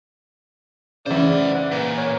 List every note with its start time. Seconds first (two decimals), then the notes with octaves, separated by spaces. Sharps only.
1.06 C#3 E3 C5 D5 F#5
1.54 F#5
1.71 A#2 B4
1.97 C#5